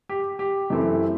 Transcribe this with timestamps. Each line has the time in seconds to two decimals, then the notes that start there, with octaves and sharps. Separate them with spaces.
0.09 G4
0.39 G4
0.70 F#2 E3 A3 C4 E4